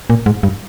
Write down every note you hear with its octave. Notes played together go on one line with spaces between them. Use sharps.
A#2
G#2
G2